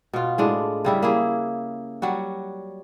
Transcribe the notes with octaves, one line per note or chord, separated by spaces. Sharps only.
B2 F4
A2 G#3 D4
C#3 G3 E4
A#3 E4 G#4
F#3 G3 F#4